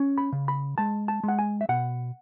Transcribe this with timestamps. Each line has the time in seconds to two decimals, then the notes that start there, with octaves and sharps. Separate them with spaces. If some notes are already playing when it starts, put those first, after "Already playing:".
Already playing: C#4
0.18 B5
0.32 C#3
0.48 B5
0.78 G#3 A5
1.08 A5
1.23 G#3 F#5
1.39 G#5
1.61 E5
1.69 B2 F#5